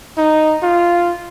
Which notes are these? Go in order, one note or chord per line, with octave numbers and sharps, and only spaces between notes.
D#4
F4